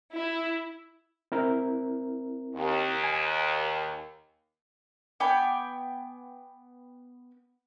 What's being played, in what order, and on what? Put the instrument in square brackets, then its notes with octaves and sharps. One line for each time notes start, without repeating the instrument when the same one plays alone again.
[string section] E4
[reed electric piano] C4 E4 A#4
[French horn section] D#2
[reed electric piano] G#5
[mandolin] B3 G5 G#5 D6